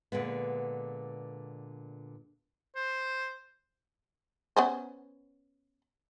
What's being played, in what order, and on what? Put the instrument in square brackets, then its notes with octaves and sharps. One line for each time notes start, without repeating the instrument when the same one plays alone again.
[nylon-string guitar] A#2 D3 G#3 B3
[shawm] C5
[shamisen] B3 C#4 C5